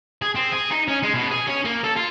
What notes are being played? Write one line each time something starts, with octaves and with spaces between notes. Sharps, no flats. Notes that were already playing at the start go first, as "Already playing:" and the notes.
G#4
C4
G#4
D#4
C#4
G#3
B2
G#4
C#4
A#3
A4
F4